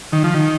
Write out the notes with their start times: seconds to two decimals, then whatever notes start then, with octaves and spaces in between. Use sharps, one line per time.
0.12 D#3
0.24 F3
0.35 D#3